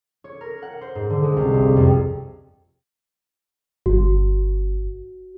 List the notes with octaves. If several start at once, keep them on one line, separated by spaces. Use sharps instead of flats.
C#5
A#4
F#5
C5
G#2
D3
G#3
C2
G1
F2
G1 F#4